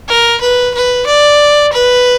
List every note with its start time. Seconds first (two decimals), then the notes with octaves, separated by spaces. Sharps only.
0.09 A#4
0.41 B4
0.75 B4
1.07 D5
1.73 B4